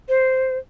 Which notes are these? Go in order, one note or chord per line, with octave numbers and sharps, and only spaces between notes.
C5